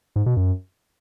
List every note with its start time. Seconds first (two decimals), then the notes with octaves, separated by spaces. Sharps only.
0.16 G#2
0.26 B2
0.37 F#2